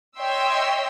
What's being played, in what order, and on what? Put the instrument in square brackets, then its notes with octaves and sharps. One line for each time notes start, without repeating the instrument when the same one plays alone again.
[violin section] C#5 D#5 E5 G5 C6 E6